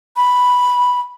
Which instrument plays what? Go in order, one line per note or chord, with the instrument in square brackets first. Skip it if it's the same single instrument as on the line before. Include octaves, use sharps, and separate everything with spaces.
[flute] B5